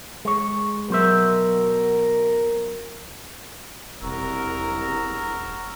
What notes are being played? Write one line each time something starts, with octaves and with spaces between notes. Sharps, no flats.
G#3 C#5
B2 F#3 A#4 C5 E5
E1 C2 F#3 F#4 A#4 E6